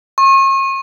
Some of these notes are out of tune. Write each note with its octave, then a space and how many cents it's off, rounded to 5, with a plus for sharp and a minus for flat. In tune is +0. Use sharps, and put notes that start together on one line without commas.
C#6 -40